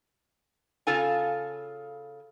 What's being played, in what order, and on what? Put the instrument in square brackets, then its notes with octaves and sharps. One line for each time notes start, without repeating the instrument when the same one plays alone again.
[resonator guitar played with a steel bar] C#3 F4 A4 F5 G#5